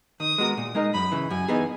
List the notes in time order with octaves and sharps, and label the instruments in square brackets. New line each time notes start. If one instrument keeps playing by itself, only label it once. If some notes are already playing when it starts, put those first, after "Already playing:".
[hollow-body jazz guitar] D#3 [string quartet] D#6
[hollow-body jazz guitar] G#3 B3 F#4 A#4
A#2
G#3 D#4 A#4 D#5
[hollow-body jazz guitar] F#2 [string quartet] B5
[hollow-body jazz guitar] C#3 E3
[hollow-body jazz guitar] F#2 [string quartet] G#5
[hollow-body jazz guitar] E3 B3 D#4 G#4